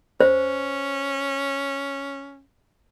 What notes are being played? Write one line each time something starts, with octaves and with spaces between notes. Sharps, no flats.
C#4 C5